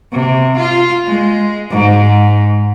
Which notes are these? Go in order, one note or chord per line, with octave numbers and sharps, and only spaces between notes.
C3
F4
G#3
G#2